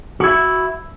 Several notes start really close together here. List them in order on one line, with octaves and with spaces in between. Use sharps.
F#4 E4 E5